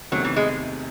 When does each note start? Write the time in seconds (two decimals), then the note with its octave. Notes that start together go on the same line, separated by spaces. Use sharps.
0.12 E2 C3 D#3 F#3 A3
0.24 E3
0.36 G#3